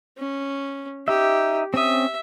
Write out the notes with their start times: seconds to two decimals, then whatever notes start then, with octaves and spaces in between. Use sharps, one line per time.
0.18 C#4
1.08 D#4 G4 E5
1.74 C4 C#4 E5 D#6